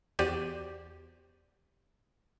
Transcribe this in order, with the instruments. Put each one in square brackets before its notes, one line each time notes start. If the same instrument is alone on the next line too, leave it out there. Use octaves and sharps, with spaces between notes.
[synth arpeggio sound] E2 F#4 G4 C5 D5 D#7